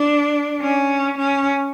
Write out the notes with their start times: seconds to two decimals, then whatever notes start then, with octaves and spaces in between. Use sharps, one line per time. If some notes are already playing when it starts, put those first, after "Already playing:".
Already playing: D4
0.61 C#4
1.18 C#4